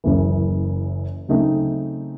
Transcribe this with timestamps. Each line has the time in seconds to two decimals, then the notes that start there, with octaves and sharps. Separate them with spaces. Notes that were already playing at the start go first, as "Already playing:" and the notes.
0.04 F#1 F#2 C#3 E3
1.28 C#3 F#3 A3 C4 D#4